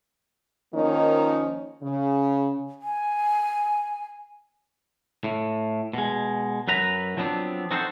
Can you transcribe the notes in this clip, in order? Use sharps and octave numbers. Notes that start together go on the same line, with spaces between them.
D#3 F3 A#3 C#4 D#4
C#3
G#5
A2
B2 G#3
F#2 F#3 B4 A#5
F3 F#3 B3 C4 D4
C4 D#4 F#4 A4 A#4 C5